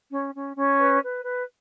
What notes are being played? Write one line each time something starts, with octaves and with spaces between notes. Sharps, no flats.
C#4
C#4
C#4
B4
B4
B4